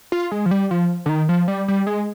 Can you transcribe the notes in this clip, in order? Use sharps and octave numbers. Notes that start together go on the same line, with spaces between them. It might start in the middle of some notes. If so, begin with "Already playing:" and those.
F4
G#3
F3
G3
F3
D3
D#3
F3
G3
G3
G#3